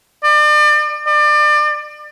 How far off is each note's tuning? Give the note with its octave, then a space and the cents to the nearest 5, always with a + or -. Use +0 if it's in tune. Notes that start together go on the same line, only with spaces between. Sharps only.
D5 +35
D5 +30